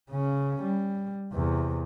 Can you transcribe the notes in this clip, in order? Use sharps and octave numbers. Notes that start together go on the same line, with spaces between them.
C#3 C#4
G3
E2 C3